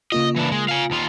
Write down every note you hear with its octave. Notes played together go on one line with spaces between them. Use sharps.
C#3 A#3 F4 D#5
E3 D4
G#3
F5 G#5
D#2 F4